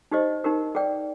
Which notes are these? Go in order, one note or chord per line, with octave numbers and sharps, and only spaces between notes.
D#4 G4 C5 D#5
D#4 G4 A#4
G#4 D5 G5